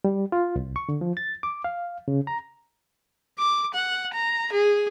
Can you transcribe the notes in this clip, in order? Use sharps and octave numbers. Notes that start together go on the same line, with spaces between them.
G3
F4
C2
C#6
D3
F3
A6
D6
F5
C#3
A#5
D6
F#5
A#5
G#4